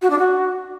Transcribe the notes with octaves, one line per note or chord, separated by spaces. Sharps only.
F#4
D4
F#4